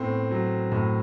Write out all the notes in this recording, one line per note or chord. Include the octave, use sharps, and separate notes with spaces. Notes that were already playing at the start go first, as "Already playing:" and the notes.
Already playing: A2 A3 B3 C4
F#3
A2